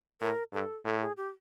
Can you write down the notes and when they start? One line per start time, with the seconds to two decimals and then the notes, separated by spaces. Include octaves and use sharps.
0.21 A2 A#4
0.53 G2 A4
0.85 A2 A4
1.01 G#4
1.17 G4